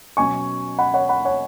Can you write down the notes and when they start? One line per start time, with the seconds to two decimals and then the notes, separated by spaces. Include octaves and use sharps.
0.17 B2 F#3 C#4 G#5 C#6
0.79 F#5 B5
0.94 C#5 F#5
1.09 F#5 B5
1.25 C#5 F#5